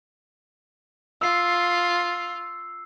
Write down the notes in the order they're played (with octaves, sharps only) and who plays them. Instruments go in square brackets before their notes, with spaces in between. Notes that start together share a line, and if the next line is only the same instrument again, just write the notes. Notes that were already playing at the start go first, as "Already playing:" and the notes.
[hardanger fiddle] F4 [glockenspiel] E6 C7